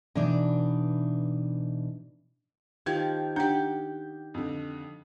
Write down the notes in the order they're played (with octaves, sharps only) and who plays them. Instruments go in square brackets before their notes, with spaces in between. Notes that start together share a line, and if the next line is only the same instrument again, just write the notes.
[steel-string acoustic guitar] B2 E3 D4 D#4
[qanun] D#3 F3 G4 [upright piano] G#6
[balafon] D4 [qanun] G4 F#5 [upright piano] G6
[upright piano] F2 D3